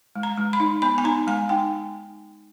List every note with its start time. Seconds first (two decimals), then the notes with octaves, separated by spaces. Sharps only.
0.16 G#3
0.23 A#5
0.37 G#3
0.53 B5
0.60 D#4
0.82 B3 B5
0.98 G#5
1.04 D#4 A#5
1.27 G#3 G#5
1.49 D#4 G5